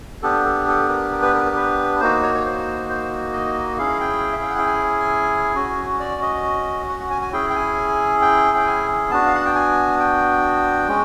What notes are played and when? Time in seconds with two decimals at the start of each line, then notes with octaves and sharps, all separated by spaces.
0.23 B3 D4 G4 A4
0.45 A4
0.68 A4
0.89 A#4
1.12 A#4
1.22 B4
1.35 A#4
1.46 A#4
1.56 B4
2.00 A#3 D#4 F#4 C5
2.23 C#5
2.35 C#5
2.45 C5
2.89 C5
3.33 D#5
3.78 C#4 E4 G#4 F5
4.01 G5
4.33 E5
4.42 F5
4.51 F#5
4.58 G5
4.66 G#5
5.56 C#4 F#4
6.00 D5
6.22 D#5
6.89 F#5
7.00 F#5
7.10 G#5
7.22 G#5
7.33 C#4 E4 G#4 G5
7.50 G5
7.56 G#5
8.22 G5
8.58 G5
8.67 G#5
9.10 B3 D4 F#4 A5
9.26 F5
9.35 F#5
9.45 G5
9.55 G#5
10.00 G5
10.88 G#3 C#4